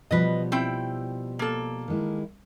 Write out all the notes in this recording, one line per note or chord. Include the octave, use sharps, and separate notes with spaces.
B2 F3 G3 B4 D#5
C4 E4 G5
A#3 A4
D#3 G#3 E4